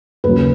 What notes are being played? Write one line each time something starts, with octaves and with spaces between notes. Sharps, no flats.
D#2 C#3 F#3 B4